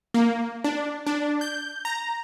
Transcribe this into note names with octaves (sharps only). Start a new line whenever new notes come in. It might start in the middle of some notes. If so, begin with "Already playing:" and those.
A#3
D4
D4
G6
A#5